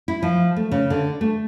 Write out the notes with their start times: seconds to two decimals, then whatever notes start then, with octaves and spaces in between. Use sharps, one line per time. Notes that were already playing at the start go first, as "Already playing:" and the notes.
0.08 E4
0.22 F3
0.56 A3
0.71 C#3
0.90 D3
1.21 A3